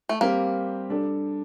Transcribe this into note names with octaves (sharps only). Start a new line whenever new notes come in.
A3
G3 A#3 C4 G4 A#4
G3 D4 A4